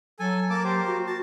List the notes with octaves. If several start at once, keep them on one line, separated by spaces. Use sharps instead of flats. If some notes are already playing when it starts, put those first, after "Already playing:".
F#3 A4 G#5
A#3 A5 D6
A#3 G4 C5
F#4
F#4 A5